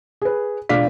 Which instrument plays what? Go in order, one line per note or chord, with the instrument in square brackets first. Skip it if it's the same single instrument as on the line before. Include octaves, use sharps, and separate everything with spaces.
[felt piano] G#4 B4
[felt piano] E1 B6 [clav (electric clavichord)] D4 F4 F5